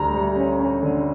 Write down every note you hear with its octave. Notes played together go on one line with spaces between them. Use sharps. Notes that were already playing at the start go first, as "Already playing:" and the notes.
Already playing: D2 G3 A#5
G3
C#4
C#4
D3